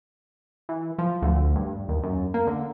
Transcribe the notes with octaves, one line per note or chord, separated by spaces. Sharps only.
E3
F3
D2
G2
D#2
F#2
A#3
D3